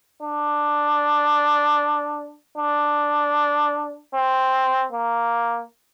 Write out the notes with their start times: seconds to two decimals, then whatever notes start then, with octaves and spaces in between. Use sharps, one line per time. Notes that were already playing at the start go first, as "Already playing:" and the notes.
0.23 D4
2.58 D4
4.14 C4
4.92 A#3